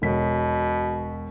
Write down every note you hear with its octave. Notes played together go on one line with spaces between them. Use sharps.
E1 B2 B6